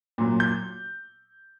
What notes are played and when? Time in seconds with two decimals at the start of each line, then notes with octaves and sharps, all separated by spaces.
0.18 A#2 F#3
0.40 G6